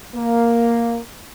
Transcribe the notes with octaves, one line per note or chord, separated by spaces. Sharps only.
A#3